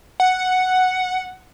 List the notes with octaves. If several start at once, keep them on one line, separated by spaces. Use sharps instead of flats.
F#5